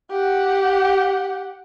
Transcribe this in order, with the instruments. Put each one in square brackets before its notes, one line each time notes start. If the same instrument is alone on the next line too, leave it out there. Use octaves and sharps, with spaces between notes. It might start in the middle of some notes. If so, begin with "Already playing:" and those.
[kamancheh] G4 F#5